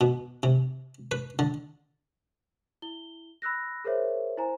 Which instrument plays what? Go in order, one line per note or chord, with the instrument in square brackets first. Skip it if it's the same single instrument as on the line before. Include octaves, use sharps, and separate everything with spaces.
[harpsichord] B2
C3
B4
D3
[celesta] E4 G7
B5 E6 F#6 A#6
G#4 A#4 C5 C#5 E5
E4 C5 G#5 A#5